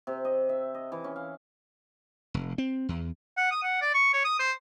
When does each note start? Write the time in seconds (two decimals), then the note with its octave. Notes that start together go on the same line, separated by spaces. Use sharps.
0.07 C3
0.25 D#5
0.49 E5
0.74 D#5
0.92 E3
1.04 C#4
1.16 F5
2.34 F1
2.58 C4
2.89 E2
3.37 F#5
3.51 D#6
3.63 F#5
3.81 D5
3.94 C#6
4.13 C#5
4.25 D#6
4.39 C5